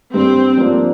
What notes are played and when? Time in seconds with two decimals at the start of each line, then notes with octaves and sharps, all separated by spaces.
0.13 G2 C4
0.58 F3 A#3 D4